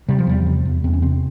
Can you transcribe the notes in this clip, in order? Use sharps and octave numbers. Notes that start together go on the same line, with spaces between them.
C3 G3
F3
E2 G3
C3
E2
E2 C4
C#4
C3 C4